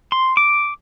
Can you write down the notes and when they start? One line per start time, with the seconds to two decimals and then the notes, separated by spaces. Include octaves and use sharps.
0.12 C6
0.37 D6